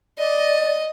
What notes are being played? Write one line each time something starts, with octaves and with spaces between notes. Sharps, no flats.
D5 D#5